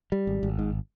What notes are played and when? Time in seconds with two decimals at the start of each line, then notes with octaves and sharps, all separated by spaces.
0.12 G3
0.27 G#1
0.43 G#1
0.59 G#2